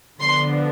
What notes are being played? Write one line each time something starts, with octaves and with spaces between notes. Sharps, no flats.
D3 F3 B3 D4 C6